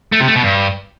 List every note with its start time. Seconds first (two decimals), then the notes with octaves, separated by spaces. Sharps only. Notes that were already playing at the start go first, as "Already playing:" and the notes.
0.12 A3
0.20 C3
0.28 A3
0.35 B2
0.43 G2